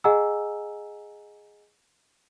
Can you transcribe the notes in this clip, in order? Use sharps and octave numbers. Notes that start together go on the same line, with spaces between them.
G#4 D#5 F#5 G#5 A#5 E6